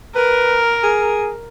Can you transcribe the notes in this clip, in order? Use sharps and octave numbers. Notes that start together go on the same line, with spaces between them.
A#4 B4
G#4